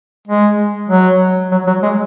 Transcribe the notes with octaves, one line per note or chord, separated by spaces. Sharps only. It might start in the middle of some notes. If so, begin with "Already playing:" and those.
G#3
F#3
F#3
F#3
G#3